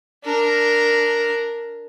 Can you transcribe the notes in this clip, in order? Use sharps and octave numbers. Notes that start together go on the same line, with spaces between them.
D4 A#4